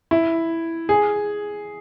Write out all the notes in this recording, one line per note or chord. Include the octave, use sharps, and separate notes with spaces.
E4
G#4